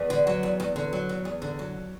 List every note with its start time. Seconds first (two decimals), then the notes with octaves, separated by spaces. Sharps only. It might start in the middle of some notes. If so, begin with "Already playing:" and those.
Already playing: E2 B4
0.10 D3
0.27 F#3
0.43 E2
0.60 E2
0.76 D3
0.93 F#3
1.09 E2
1.25 E2
1.42 D3
1.59 F#3